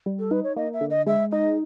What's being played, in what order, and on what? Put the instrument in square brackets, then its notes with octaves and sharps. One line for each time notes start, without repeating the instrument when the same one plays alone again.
[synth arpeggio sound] G3
[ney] A4
[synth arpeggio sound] D#4 [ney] B4
[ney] C#5
[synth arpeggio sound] A#3 [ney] D#5
[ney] E5
[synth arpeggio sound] D3
[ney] D#5
[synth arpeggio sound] G#3 [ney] E5
[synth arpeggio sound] D#4 [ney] D#5